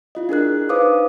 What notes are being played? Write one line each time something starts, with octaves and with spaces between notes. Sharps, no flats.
E4 F4 D#5
D4 G#4 A#4 F#6
D#4 B4 C5 F5 D6 D#6